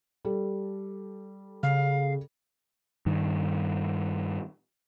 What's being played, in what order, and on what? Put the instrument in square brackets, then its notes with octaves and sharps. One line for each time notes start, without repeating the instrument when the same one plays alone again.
[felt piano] G3 A4
[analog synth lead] C#3 [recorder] F5
[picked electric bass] G2 D#3